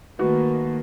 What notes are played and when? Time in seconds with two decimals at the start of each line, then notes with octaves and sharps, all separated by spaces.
0.19 D#3 A3 A#3 F#4 B4